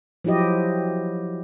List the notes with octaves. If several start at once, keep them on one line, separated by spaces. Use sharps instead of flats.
F3 F#3 E4 G4 D#5